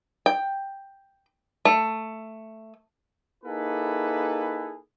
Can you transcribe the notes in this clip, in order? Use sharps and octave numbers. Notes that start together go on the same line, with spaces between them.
G5
A3
A#3 D#4 E4 G#4 A4 B4